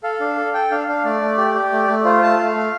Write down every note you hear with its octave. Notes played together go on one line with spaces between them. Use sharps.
A4 F5
D4
A4
A4 G5
D4 F5
D4 F5
A3 D5
A3
G4
G4
A3
A3
F4 C5
A3 A5
A3 F5
A3